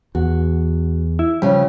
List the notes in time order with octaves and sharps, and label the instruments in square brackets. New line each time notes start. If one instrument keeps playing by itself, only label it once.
[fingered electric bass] E2 [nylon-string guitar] F#4
[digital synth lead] E4
[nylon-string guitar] C#3 F3 [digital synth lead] G3